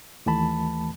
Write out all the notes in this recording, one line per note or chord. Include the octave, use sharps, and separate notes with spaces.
D#2 E3 A3 A5 B5